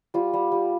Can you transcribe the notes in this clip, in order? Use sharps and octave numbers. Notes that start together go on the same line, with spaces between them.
G3 F4
G3
G3